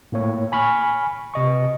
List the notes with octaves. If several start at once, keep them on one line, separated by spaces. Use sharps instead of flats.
A2 A#3 C#5
G#5 B5 C#6 F6
C3 D#5 C#6